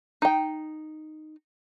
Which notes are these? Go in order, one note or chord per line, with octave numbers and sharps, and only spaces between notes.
D#4 G5